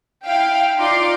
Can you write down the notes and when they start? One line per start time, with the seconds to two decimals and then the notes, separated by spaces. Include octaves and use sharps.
0.25 E4 F5 G5
0.78 D#4 F4 D5 C6 D6